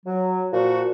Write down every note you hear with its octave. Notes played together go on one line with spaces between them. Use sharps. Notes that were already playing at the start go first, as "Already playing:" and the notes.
F#3
A#2 F3 F#4